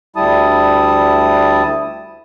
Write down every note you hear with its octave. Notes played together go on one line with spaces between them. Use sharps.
D2 G3 E4 A5 D#6